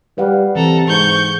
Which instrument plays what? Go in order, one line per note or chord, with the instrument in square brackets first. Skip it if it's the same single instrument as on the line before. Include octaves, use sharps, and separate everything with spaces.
[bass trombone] G3 [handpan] B4 F5 F#5
[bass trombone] C3 [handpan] E3 [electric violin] A4 A#5
[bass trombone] G#2 [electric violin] C#6 G6